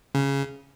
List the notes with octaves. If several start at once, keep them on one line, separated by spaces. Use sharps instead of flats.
C#3